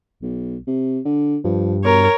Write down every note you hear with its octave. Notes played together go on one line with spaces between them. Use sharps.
B1
C3
D3
G2 F3
B2 A#4 C#5